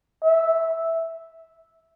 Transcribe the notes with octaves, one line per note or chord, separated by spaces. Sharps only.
E5